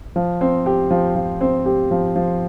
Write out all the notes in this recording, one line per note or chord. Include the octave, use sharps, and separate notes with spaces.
F3
C4
G4
F3
F3
C4
G4
F3
F3